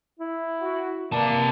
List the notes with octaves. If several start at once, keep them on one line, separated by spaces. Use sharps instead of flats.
E4
F#4
C3 E3 A#3 D5 A5